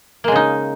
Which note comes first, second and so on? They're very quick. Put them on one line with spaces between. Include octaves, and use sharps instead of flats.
A#3 G#3 C#3 D#4